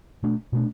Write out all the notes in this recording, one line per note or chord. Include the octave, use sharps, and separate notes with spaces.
B2 A3 D4
B2 A3 D4